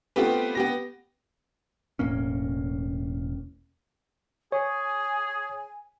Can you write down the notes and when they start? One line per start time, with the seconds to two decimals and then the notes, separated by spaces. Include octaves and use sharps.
0.16 A3 B3 C4 F4 G4 B4
0.55 B3 G4 A#6
1.99 E1 A2 A#3 C#4
4.52 G#4 C#5 G#5